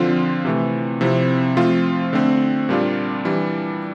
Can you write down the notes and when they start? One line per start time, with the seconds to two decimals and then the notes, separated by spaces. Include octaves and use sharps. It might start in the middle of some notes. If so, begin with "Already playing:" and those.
Already playing: D3 F3 C4 F4
0.45 C3 E3 A3
1.01 C3 F3 C4 E4
1.57 F3 A3 C4 F4
2.13 D3 A3 C4
2.69 A#2 G3 D4 F4
3.25 E3 G3 D4